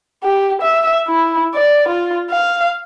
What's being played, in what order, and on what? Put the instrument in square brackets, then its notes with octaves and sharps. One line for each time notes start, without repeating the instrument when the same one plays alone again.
[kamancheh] G4
E5
E4
D5
F4
F5